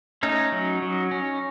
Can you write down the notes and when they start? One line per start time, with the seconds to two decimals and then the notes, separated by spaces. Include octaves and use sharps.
0.23 A3 C#4 D#4
0.52 F#3
0.82 F#3
1.11 C#4